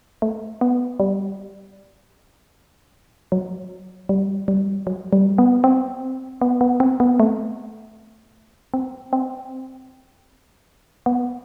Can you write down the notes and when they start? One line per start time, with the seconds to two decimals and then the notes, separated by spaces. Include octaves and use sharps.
0.22 A3
0.61 B3
1.00 G3
3.32 F#3
4.09 G3
4.48 G3
4.87 F#3
5.13 G3
5.38 B3
5.64 C4
6.42 B3
6.61 B3
6.80 C4
7.00 B3
7.20 A3
8.74 C4
9.13 C4
11.06 B3